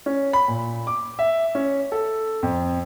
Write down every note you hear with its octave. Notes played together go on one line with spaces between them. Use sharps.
C#4
B5
A#2
D6
E5
C#4
A4
F2